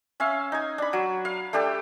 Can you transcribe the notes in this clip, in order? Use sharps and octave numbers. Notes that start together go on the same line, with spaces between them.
C#4 E5 F5
D#4 G#5
D4 B5
F#3
F5
A3 D4 G4 A4